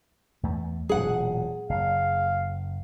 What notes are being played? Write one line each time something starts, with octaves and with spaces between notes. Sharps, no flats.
E2 A3
E1 A#2 F#3 G#4 F#5
F#1 F5